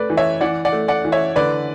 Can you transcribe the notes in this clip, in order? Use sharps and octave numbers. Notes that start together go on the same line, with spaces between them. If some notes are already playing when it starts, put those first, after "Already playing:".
Already playing: A3 B4 D5
E3
C#5 E5
E3 D5 F#5
D5 F#5
A3
D5 F#5
E3
C#5 E5
D3 B4 D5